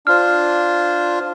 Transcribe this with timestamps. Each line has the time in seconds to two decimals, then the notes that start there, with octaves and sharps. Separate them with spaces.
0.06 D4 F4 C5 F6